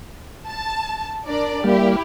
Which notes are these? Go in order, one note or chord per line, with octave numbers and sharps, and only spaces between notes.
A5
D4 A#4 D5
G3 A#3 E4 G4